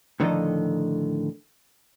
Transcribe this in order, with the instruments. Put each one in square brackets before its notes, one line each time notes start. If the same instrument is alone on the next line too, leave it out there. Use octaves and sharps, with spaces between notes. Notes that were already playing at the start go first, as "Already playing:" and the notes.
[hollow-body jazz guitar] A2 D3 D#3 F3 A4 D#5